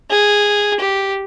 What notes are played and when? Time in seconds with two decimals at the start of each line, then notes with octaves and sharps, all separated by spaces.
0.10 G#4
0.80 G4